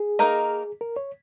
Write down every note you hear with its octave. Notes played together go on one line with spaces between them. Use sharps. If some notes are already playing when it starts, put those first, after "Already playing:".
Already playing: G#4
A#3 D#4 A#4 D#5
A#4
C#5